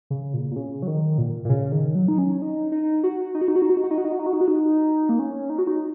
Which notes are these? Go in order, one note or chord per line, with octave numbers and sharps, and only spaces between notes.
C#3
A#2
A#2
C#3
F#3
D#3
A#2
A#2
C#3
D#3
F#3
D#4
C#4
D#4
D#4
F#4
D#4
F#4
D#4
F#4
D#4
F#4
D#4
F#4
D#4
F#4
D#4
F#4
D#4
F#4
D#4
F#4
D#4
A#3
C#4
D#4
F#4
D#4